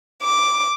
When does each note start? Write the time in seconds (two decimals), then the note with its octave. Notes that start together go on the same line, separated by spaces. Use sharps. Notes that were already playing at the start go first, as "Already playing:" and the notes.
0.23 D6